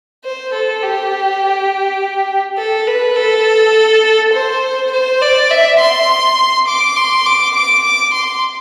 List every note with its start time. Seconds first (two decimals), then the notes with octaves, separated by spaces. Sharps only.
0.24 C5
0.53 A4
0.82 G4
2.58 A4
2.87 B4
3.16 A4
4.34 C5
4.92 C5
5.22 D5
5.51 E5
5.80 C6
6.68 D6
6.97 C6
7.26 D6
7.55 D6
7.84 D6
8.14 C6